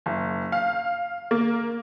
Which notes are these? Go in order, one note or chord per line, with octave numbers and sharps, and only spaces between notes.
F#1
F5
A#3